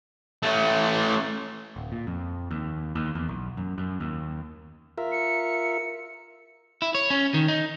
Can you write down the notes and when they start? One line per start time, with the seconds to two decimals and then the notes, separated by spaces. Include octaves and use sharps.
0.43 A3 C#4
1.76 D1
1.92 A#2
2.07 F2
2.51 D#2
2.95 D#2
3.15 E2
3.29 B1
3.57 F#2
3.78 F#2
4.00 D#2
4.98 F4 A#4 E5
5.12 C#7
6.82 E4
6.95 C#5
7.10 C#4
7.34 D#3
7.48 D#4